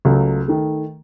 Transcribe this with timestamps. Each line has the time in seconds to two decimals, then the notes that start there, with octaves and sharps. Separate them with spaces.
0.05 C#2 C#3 F#3 A3
0.48 D#3 A3